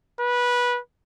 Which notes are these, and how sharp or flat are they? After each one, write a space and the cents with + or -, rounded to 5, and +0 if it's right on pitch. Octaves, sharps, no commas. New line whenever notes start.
B4 -20